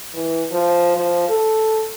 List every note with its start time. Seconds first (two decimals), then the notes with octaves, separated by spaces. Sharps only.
0.14 E3
0.52 F3
0.96 F3
1.29 A4